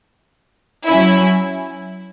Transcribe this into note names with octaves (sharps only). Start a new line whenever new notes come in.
F#3 C#4 E4